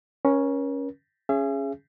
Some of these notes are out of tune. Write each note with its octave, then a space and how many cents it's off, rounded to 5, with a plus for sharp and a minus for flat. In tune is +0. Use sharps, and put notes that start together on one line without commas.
C#4 +0 A#4 +40
C#4 +0 G#4 +0 E5 +45